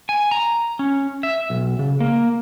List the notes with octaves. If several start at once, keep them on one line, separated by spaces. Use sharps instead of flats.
G#5
A#5
C#4
E5
B1
C#3
A#3